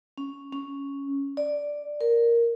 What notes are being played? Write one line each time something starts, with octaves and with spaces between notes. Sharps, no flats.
C#4
C#4
D5
A#4